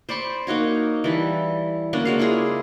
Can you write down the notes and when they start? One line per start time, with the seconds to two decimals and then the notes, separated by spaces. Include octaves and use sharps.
0.09 C5 D5 B5 C#6
0.47 A#3 D#4 F#4 C#5
1.04 E3 G3 A4
1.93 A#3 C#4 D4 F#4
2.05 C#3 G#3 F#4 F5
2.19 E4 F4 G#4